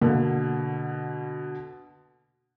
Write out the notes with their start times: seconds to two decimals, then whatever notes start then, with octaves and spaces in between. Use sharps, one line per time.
0.02 B2 D3 A#3